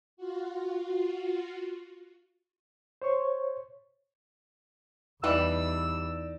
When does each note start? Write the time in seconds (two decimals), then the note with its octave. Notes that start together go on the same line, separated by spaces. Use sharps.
0.17 F4 F#4
3.02 C5 C#5 C#6
5.24 E2 E3 G3 D#4 B4 D5 E6